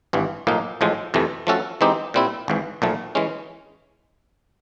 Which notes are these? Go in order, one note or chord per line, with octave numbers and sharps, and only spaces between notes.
G#1 G2 E3
B1 A2 F3 A#3 D#4
A1 A2 F3 G#3
F2 C3 E3 A3
F3 A3 C#4 F#4 A4
E3 G#3 C4 D#4 G4
A#2 G3 C4 E4
G#1 G#2 E3
B1 A#2 F3 A3
E3 G#3 C#4